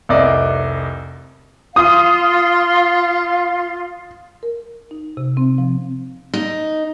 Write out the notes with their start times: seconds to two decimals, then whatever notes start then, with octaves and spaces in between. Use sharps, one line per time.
0.09 F1 C2 D5 D#5
1.76 F4 F5 C6 D#6
4.43 A#4
4.91 D#4
5.17 C3
5.37 C4
5.58 F3
6.34 D#4